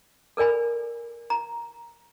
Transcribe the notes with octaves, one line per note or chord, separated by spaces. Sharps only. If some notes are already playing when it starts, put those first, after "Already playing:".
A4 A#4 D5 G#5 B5
A#5